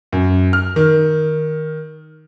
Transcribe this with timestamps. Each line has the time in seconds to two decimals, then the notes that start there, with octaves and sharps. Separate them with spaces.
0.12 F#2
0.53 F6
0.76 D#3